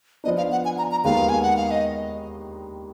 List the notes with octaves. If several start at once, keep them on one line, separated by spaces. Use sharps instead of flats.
F3 B3 D4 D#5
F5
F#5
G#5
A#5
A#5
D#2 D#3 G#3 B3 F5
G#5
F#5
F5
D#5